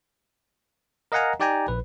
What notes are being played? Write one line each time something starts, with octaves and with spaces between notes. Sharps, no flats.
A#4 D#5 F5 F#5 G#5 A#5
D#4 G4 D5 G5 G#5 A#5
A#1 B4